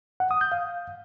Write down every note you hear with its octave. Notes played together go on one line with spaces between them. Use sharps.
F#5
D#6
G6
F5